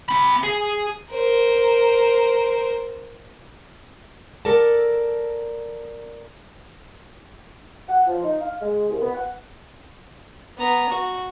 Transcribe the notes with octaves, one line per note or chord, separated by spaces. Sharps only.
C4 B5
G#4
A#4 C5
A4 A#4 D5 A5
F#5
F3
D#4
F5
G#3
C2
B3
F#5
B3 A#5
F#4